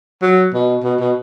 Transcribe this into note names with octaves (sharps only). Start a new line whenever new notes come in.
F#3
B2
B2
B2